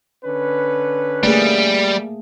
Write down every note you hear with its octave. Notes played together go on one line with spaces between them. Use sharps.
D3 C#4 B4
G3 A3 A#3 G#4